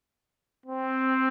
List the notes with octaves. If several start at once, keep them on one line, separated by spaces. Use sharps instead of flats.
C4